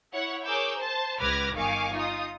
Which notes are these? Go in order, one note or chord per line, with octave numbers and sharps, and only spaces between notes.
E4 C#5 F#5
G#4 A#4 C#5 D6 E6 G6
C5 A5
C#2 B4 D6 F6 G#6 A#6
G1 D#3 F5 G#5 C#6 D6
D#4 F4 D#6